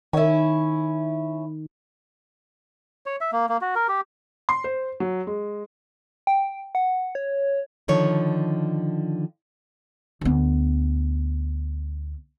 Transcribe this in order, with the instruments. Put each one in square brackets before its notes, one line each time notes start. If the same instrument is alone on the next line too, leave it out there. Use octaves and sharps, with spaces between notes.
[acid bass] D#3 [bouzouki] C#4 E4
[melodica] C#5
E5
A#3
A#3
F#4
A#4
G4
[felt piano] C6
C5
F#3
G#3
[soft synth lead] G5
F#5
C#5
[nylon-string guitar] D3 D#3 F3 C#5
[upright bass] D2 B3